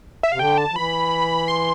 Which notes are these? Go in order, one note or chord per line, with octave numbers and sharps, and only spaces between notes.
E5
C3 F5
D3 G5
A5
F3
E3 B5
C6